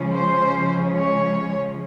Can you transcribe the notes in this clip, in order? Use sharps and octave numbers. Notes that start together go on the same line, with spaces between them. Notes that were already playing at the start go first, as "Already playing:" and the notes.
Already playing: C#3 F3 G#3 C#4
C5
C#5